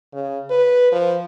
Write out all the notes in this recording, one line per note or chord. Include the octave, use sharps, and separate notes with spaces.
C#3
B4
F3